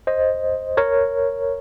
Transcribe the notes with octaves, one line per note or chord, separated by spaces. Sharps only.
C5 D#5
A#4 C#5